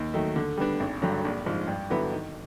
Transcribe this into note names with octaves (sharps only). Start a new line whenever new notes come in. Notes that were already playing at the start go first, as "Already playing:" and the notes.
Already playing: D#2
D#3 F#3 A3
D3
G3 B3 D4
G#1
G2 D3 F#3
A#1
G#2 F3
G2
D3 F#3 B3 E4
D#3